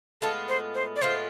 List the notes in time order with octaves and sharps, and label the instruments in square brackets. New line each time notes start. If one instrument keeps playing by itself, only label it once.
[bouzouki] A2 G#3 B3 F4 [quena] A4
[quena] C5
C5
D5
[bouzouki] A2 G#3 B3 F4 [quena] C5